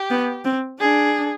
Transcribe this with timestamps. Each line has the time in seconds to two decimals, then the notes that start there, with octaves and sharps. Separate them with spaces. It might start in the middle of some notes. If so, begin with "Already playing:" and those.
Already playing: G4
0.10 B3
0.45 C4
0.80 D4 G#4